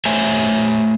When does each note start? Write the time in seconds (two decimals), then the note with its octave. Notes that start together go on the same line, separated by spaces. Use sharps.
0.05 A3 C5 C#5 E5 G#5